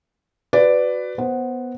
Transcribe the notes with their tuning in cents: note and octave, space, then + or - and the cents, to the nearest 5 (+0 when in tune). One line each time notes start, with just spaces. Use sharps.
F#4 +0 B4 +15 D5 +0
B3 +0 C5 +5 F#5 +0